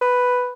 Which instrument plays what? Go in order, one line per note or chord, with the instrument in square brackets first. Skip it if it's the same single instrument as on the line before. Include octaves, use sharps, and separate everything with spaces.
[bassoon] B4